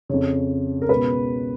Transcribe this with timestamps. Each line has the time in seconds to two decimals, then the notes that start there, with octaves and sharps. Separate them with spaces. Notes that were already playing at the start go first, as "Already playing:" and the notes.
0.09 F2 C#3 C#5
0.82 A#4
0.89 C#2 B2 B4